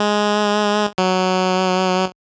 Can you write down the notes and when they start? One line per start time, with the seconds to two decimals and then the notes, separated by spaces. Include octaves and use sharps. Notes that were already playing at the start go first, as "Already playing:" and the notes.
Already playing: G#3
0.98 F#3